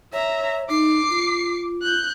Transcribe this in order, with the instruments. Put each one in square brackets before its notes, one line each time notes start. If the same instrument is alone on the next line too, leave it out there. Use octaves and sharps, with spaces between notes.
[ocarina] C#5 [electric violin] E5 A#5
[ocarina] D#4 [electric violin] D6 C7
[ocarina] F4
[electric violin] F#6 G6